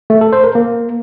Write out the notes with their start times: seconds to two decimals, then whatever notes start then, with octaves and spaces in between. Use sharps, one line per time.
0.10 A3
0.21 A4
0.33 C5
0.44 A#4
0.55 A#3